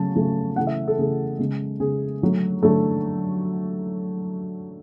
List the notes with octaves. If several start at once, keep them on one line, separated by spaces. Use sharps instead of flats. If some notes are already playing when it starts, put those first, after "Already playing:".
Already playing: C#3 F#3 A3 A5
C#3 F#3 A3
C#3 E3 A3 F#5
E5
A4
C#3 E3 A3 G#4
C#3 G#3
C#3 G#3 G#4
D3 F#3 A3
D3 F#3 A3 A4